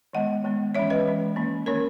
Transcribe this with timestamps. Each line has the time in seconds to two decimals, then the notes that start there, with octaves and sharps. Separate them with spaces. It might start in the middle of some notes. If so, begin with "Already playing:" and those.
0.13 D#3 G#3 B3 D#5 F#5
0.44 D#3 G#3 B3
0.75 E3 G#3 C#4 C#5 E5
0.90 B4 D#5
1.06 E3 G#3 C#4
1.36 D#3 A#3 C#4
1.66 D#3 A#3 C#4 A#4 C#5